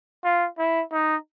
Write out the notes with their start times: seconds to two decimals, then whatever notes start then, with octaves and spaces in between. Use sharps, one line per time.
0.24 F4
0.58 E4
0.92 D#4